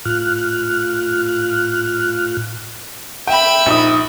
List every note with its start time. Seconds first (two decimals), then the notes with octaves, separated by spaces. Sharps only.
0.05 A2 F4 F6 F#6
3.27 E5 G5 B5
3.66 A#1 D#4 D#6